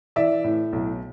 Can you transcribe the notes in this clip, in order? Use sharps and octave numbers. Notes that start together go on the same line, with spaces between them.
E3 D5 E5
A2
B1